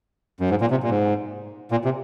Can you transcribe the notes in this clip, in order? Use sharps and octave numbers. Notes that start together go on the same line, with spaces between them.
F#2
G#2
A#2
C3
A#2
G#2
A#2
C3